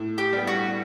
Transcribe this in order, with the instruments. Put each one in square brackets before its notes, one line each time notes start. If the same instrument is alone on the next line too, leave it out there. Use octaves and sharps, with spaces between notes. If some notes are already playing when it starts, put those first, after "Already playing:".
Already playing: [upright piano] A2
[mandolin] G4
[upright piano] G3 B3
[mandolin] F#4